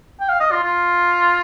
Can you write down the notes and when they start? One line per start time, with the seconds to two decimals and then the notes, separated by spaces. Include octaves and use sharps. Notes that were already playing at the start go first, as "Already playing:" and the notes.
0.21 G5
0.29 F5
0.40 D#5
0.52 F4
0.63 F4